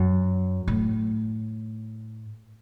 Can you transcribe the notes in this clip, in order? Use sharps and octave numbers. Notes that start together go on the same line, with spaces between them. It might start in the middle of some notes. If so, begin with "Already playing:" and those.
Already playing: F#2
A2